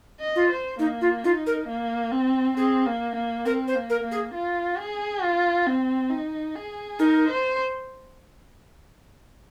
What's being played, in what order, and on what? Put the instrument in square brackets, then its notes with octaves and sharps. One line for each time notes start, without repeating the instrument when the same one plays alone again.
[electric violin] D#5
[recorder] F4
[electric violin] C5
[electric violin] A#3 [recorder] D#4
[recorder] F4
[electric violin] D#4 [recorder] F4
[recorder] A#4
[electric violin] A#3
C4
[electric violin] C4 [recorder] G#4
[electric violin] A#3
A#3
[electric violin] C4 [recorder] A#4
[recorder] C5
[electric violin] A#3
[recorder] A#4
[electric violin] A#3
[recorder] G#4
[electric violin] F4
G#4
F4
C4
D#4
G#4
[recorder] D#4 [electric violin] A#4
[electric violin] C5